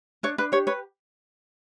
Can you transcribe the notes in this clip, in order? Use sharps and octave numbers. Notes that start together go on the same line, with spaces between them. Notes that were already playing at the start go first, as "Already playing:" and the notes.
D4 C#5
D4 B4
G4 C#5
B4 C#5